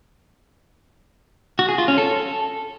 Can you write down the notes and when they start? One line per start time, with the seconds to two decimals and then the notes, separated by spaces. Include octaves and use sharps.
1.59 F#4
1.69 G#4
1.78 F4
1.88 C#4
1.98 A4